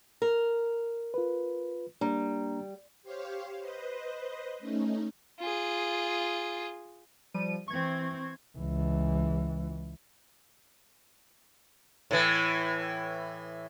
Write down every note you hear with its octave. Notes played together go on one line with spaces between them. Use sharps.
A#4
F4 B4
G3 A#3 D4 A#5
G4 C5 C#5 F5
B4 C5 D#5
A3 C#4 D#4
F4 G#4
F3 G3 D#7
E3 C4 C#6 G#6
C#2 E3
A2 E3